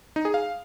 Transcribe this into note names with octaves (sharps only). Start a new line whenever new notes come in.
D#4
G#4
F5